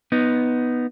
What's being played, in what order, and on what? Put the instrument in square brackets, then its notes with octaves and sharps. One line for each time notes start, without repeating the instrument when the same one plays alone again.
[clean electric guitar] B3 D#4